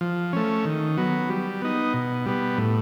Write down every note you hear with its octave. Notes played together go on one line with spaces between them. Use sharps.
F3
A3 C#4
D#3
F#3 B3
G3
B3 D#4
B2
G3 B3
A2